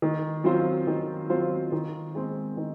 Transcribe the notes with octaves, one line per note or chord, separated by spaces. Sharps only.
D#3
F#3 C4 F4 C5
D#3
F#3 C4 F4 C5
D#3
G#3 C4
D#3